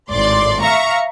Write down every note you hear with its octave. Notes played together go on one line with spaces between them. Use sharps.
G#1 A2 D5 C6
E5 F5 A#5 C#6